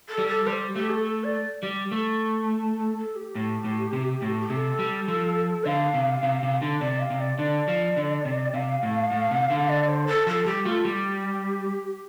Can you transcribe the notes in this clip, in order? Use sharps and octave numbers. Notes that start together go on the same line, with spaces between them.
A4
G3
A4
G3 C5
A3 G4
A4
A4
D5
G3
A3
A4
A4
G4
A2
A2
C3
A2
G4
C3 A4
G3
F3
D3 F5
C3
C3
C3
D3
C3 D5
F5
C3
D5
D3 D5
F3
D3
C3
C3 F5
A2
A2
C3
D3
D5
C5
A4
F3 A4
G3 G4
A3 F4
G3 G4